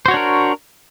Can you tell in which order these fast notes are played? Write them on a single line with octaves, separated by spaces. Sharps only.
C5 F#4 C#5 D4 A#4